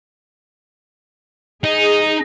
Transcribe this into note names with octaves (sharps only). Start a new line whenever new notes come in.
D#4 G#4